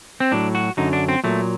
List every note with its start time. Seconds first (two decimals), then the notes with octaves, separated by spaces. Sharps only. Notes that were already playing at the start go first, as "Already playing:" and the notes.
0.20 C4
0.32 A2 F#3 D4
0.55 F#4
0.77 F#2 D3 F#3 D#4
0.93 D4
1.09 C4
1.24 A#2 F#3 A3